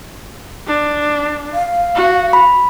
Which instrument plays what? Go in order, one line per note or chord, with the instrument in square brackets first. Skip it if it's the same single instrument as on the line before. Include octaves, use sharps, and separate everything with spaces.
[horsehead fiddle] D4
[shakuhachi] F5
[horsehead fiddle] F#4
[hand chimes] B5